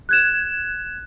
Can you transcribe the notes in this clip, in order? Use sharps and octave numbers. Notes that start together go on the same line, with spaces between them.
F#6 G#6 E7